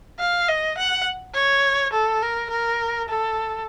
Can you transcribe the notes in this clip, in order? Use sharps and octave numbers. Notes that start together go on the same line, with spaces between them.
F5
D#5
F#5
C#5
A4
A#4
A#4
A4